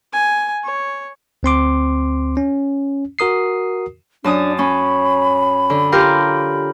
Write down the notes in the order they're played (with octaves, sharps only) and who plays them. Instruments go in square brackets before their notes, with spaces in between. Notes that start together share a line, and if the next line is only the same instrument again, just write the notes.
[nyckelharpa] G#5
C#5
[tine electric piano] D2 C4 C6 D6
C#4
F#4 A#4 D#6 C7
[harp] F#2 A5 D#6 [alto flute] D4
[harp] C#4 [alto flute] B5
[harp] D3
F4 G4 A#4